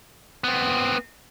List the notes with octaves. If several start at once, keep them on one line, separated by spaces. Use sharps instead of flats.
B3 C4